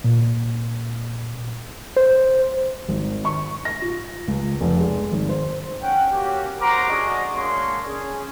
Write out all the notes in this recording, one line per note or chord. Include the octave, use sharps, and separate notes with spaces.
A#2
C5
G#1
C#6
A#6
F4
C#2
F1
G#3
G#1
C5
C#4 F#5 G5
A#3 C#4 F#4 G4
F#4 A#4 C5 A#5 D6
C#4 D4 F#4 G#4 D#5 C#6
G#3 A#3 D4 C#5 C6 C#6
C#4 G#4